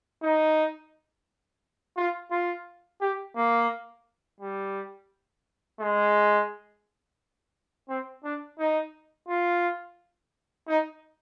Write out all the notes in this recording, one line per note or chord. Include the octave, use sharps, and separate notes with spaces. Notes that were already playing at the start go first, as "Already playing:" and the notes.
D#4
F4
F4
G4
A#3
G3
G#3
C4
D4
D#4
F4
D#4